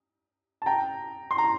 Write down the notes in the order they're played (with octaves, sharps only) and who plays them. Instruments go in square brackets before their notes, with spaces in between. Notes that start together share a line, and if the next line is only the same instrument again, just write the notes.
[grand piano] A5
G5 A#5
C6
A#5